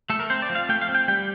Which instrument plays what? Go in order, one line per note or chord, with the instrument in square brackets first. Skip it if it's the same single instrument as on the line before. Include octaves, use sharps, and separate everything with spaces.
[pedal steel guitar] A3 A4
A#4
C4 C5
D5
F3
F5
A3 G5
F5
C4
G5
G3 G5